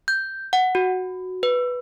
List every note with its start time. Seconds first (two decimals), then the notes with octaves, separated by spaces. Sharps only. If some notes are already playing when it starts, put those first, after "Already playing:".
0.08 G6
0.53 F#5
0.75 F#4
1.43 B4